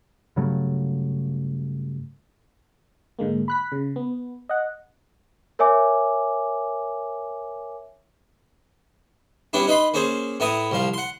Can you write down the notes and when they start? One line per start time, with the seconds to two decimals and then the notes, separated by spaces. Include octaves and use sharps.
0.36 G2 C#3 F#3 A3
3.19 G#2 D3 G#3 A#3
3.48 B5 F#6 B6
3.72 C#3
3.96 B3
4.49 D#5 F#5
5.59 A#4 C#5 E5 G#5 D6
9.53 G3 B3 C#4 D4 E4
9.67 D#4 B4 D#5 B5 C6
9.94 A#3 C#4 G#4 C5
10.40 A2 B3 E4 A#5 D#6
10.71 C2 F3 F5
10.93 F#5 C6